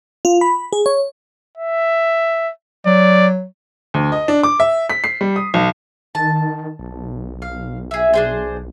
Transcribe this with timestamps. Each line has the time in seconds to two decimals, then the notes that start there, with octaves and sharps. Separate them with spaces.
0.25 F4
0.41 B5
0.73 G#4
0.86 C#5
1.57 E5
2.86 F#3 D5
3.94 D2
4.12 D#5
4.28 D4
4.43 D6
4.60 E5
4.90 B6
5.04 C7
5.21 G3
5.36 D#6
5.54 B1
6.15 D#3 A5
6.79 B1
7.42 F5
7.91 G#4 E5
8.13 D4 G#4 C5